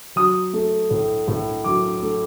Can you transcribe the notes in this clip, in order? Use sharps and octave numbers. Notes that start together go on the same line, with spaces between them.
F#3 D#6
A3
A2
A2
F#3 D6
A3